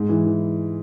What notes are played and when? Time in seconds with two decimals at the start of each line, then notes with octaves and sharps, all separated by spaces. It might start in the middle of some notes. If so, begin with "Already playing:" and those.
Already playing: G#2
0.09 E3
0.26 E3